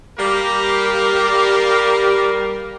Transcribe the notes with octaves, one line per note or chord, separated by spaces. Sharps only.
G3 A#3 G4 A#4